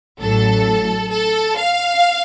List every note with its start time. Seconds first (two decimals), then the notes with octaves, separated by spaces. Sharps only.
0.21 A1 A2 F#3 A4
1.12 A4
1.58 F5